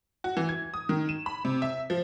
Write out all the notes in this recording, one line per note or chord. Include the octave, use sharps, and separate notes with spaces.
F#4
E3
G#6
D#6
D#3
E7
B5
C3
E5
F3